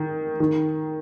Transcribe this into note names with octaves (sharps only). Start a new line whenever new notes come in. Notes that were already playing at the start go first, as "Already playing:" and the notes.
Already playing: D#3
D#3